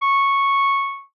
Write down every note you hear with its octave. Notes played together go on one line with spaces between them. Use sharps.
C#6